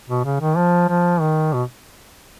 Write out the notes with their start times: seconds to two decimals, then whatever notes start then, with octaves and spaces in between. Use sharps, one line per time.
0.09 B2
0.25 C#3
0.41 D#3
0.57 F3
0.89 F3
1.20 D#3
1.53 B2